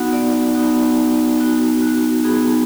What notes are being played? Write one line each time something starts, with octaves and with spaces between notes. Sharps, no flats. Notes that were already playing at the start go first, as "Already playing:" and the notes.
Already playing: B3 D#4 F#4 F#5
D5
B3 D#4 F#4
B3 D#4 F#4
F#4
B3 D#4 F#4 G#4